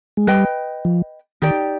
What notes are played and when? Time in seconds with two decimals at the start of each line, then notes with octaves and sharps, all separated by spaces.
0.17 G#3
0.27 G3 B4 D#5 G5
0.85 F3
1.42 D#3 D#4 G4 D5 G5